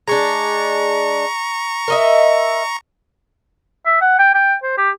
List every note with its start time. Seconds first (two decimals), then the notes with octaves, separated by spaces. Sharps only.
0.08 G#3 D4 A#5 C#6
1.88 A#4 D#5 E5
3.86 E5
4.01 F#5
4.19 G5
4.34 G5
4.63 C5
4.77 G4